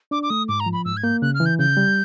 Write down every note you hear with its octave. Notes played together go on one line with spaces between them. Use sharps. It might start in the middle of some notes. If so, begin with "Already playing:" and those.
D4 D6
D6
A3 D#6
G#2 D6
A#5
F3
B5
G#2 E6
G#6
A#3 G6
C#3 F#6
F6
E3
G6
C#3 G6
G3